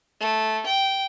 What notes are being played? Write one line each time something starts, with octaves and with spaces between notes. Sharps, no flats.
A3
G5